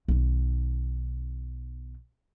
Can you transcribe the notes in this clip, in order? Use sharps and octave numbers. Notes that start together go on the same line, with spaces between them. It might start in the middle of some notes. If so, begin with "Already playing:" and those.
B1 D#3